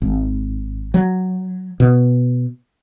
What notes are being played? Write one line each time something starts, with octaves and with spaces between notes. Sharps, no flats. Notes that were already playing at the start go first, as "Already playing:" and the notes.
G#1
F#3
B2